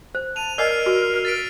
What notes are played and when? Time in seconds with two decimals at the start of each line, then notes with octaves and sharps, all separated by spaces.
0.15 C5
0.36 A5 D#7 F7
0.58 A#4 D5 D#5 E6 F6 C7
0.86 F#4
1.25 A6 B6 D7